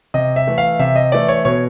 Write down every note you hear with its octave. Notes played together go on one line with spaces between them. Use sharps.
C3 D#5
E5
E3 A3
F5
C3 E5
D#5
E3 A3 D5
C#5
B2 C#5